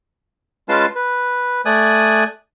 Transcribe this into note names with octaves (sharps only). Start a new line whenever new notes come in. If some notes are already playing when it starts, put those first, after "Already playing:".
G#3 C#4 F4 B4 F5 A5
B4
A3 D5 G#5 D#6 F#6